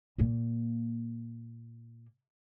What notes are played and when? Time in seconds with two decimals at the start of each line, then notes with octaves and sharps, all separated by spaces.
0.18 A#2 A#3